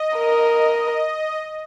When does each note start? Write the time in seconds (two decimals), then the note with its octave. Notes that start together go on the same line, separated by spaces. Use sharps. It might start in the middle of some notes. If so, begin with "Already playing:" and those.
Already playing: D#5
0.16 A#4